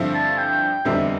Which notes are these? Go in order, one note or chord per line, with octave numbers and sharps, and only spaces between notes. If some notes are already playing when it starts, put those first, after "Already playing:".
Already playing: G2 D3 F3 C4 E4
A5
G5
F1 E2 D3 G3 C4 E5